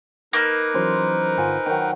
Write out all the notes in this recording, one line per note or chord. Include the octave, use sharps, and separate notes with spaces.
A#3 D#4 A#4 B4
E3 F#3 C#4 C5
G1 F4 F#5 G#5
D#3 F#3 G5